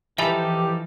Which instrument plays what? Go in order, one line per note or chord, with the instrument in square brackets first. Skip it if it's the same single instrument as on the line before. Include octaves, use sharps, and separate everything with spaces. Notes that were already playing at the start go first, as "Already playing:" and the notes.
[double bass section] E3 [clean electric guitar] F3 D#4 A4 [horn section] G4 [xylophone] E5 G#5 B5